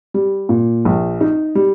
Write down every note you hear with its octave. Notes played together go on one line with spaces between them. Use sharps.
G3
A#2
A#1
D#4
G3